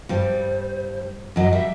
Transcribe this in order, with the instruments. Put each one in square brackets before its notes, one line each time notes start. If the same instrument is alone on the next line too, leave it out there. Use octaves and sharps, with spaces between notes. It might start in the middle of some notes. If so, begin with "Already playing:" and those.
[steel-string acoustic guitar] G2 G3 [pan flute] C5
[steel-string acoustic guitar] F#2 F#3 [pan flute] D#5
[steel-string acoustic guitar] G3 [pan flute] E5